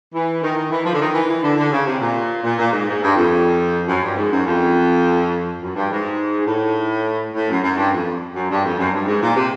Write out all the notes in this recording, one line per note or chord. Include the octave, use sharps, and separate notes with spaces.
E3
D#3
D#3
E3
F3
D3
D#3
E3
E3
D3
D3
C#3
C3
A#2
A#2
A#2
G#2
G#2
G2
F2
F#2
G2
G#2
F#2
F2
F#2
G2
G#2
A2
A2
F#2
F#2
G2
F2
F#2
G2
F2
F#2
G2
G#2
A#2
C3